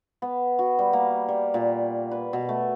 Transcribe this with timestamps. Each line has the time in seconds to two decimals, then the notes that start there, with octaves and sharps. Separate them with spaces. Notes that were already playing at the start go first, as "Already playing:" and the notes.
0.22 B3
0.59 F#4
0.79 G3
0.93 A#3
1.28 G3
1.54 A#2
2.11 B4
2.33 B2
2.49 A3